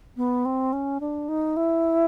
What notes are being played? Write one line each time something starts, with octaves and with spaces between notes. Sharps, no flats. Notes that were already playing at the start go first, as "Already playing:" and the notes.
B3
C4
C#4
D4
D#4
E4